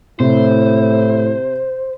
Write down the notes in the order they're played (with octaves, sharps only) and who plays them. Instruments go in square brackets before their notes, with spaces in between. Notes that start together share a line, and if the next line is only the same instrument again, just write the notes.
[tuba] A2 [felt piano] C3 [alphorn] E4 [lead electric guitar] C5